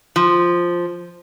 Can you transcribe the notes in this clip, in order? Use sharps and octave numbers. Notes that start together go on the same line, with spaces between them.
F3